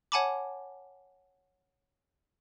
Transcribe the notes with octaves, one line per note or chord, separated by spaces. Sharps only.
C#5 F#5 G#5 A5 B5 D6